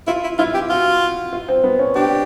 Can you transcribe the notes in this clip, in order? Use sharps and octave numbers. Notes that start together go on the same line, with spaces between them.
E4 F4
E4
E4 F4
G4
F4 F#4
F4
C4
B3
C#4
D4 G4